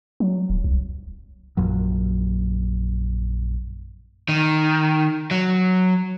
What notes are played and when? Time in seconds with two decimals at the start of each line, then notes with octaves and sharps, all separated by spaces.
0.20 F#3
0.50 D1
0.64 C2
1.57 A#1 F#2 F#3
4.29 D#3
5.31 F#3